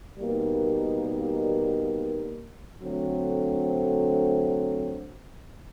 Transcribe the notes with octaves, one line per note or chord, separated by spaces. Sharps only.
B2 G3 A#3 D#4
D3 F#3 A3 C4